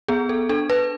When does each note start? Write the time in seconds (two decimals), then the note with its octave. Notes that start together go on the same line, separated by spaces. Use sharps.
0.08 B3 G#4
0.29 A4
0.49 D4 A4
0.70 B4